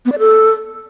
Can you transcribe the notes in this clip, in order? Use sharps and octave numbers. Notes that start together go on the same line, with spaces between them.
B3
D5
A4